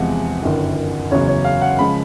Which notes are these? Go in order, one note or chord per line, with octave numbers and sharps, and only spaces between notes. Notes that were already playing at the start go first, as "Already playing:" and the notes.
Already playing: E2 C3 F3 G#3 F#5
G1 F#2 D#3
F#1 E2 C#3 F#3 C#5
C#5
F5
F#5
C#3 F3 G#3 B5